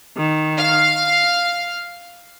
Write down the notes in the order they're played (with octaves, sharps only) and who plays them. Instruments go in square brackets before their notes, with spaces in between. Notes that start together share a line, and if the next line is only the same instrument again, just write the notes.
[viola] D#3
[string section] F5